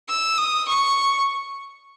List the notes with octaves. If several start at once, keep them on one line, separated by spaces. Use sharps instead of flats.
E6
D#6
C#6